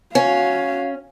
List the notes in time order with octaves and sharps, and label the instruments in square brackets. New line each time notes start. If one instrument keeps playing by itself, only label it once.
[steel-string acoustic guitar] C#4 [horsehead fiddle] F#4 F5